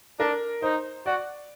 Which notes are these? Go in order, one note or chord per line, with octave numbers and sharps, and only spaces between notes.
D4 A#4
D#4 C5
F#4 D5